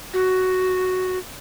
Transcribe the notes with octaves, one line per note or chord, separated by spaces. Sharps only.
F#4